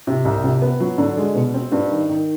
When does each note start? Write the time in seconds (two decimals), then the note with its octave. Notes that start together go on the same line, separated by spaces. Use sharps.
0.07 C3
0.25 C2
0.44 C3
0.62 B3
0.80 F#3
0.98 D3
1.17 G#3
1.35 B2
1.54 C4
1.72 G2
1.90 D#3
2.09 D#3